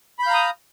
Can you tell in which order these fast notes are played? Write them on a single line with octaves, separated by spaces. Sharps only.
B5 G6 F5 A#5 D#6